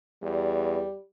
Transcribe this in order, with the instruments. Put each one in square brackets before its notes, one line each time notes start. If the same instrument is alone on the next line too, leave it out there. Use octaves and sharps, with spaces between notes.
[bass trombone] E2 [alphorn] G3